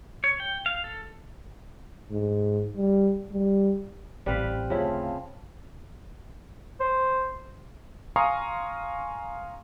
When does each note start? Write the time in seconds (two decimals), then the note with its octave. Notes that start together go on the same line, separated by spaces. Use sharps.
0.24 C#5
0.40 G5
0.66 F5
0.84 A4
2.11 G#2
2.77 G3
3.33 G3
4.26 A1 G3 C4 B4 F5
4.70 D2 C#3 F3 A3 E4 F5 A5
6.80 C5
8.16 F5 G#5 A#5 C6 C#6 D#6